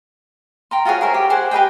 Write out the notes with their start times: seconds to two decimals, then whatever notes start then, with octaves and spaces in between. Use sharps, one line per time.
0.71 G5 A#5 C6
0.85 F4 F#4 G#4 C#5
1.01 G#4 A#4 C5 E5
1.14 G4
1.30 G#4 C5 F#5 C6
1.51 G4 B4 D#5 G5